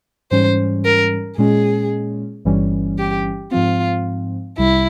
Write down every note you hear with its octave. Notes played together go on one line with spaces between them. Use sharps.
G#2 E3 G3 C#4 C5
A#4
A#2 G#3 C#4 G#4
G1 G2 E3 G3 C#4
G4
G#2 F3 C4 F4
C2 C3 G3 E4